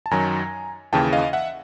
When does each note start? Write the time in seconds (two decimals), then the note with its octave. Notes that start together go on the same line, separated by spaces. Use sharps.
0.06 A5
0.11 F#2 D#3 F#3 G#5 A#5
0.93 D#2 C#3 E3 G5 A5
1.13 D#5 F5
1.33 E5 F#5